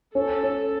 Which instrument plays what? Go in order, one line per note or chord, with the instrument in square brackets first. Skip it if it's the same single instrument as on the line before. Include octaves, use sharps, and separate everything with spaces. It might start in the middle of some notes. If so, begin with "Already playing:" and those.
[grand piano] C#4 [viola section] A4
[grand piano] C#4